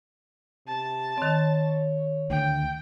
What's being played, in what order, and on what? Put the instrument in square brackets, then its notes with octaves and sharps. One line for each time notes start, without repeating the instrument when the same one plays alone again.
[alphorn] C3 [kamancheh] A5
[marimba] D#3 C4 [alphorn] C#5
[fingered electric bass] D2 [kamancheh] G5